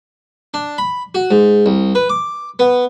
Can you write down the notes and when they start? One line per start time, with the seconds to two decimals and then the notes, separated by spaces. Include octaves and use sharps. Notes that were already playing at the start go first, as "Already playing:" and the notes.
0.54 D4
0.78 B5
1.15 F#4
1.31 G#2
1.66 C2
1.95 B4
2.09 D6
2.59 B3